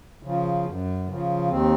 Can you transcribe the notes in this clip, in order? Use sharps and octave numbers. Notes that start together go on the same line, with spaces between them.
C#3 F3
F#2
C#3 F3
D#2 C4